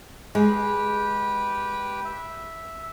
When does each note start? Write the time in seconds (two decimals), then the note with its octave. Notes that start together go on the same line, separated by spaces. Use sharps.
0.35 G#3 G4 B4 G5
2.05 E5